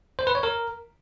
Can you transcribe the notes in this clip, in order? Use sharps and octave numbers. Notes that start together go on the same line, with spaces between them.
C5
B4
C#5
A#4